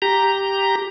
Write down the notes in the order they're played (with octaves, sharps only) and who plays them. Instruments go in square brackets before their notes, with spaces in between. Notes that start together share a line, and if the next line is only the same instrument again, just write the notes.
[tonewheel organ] G4 A#5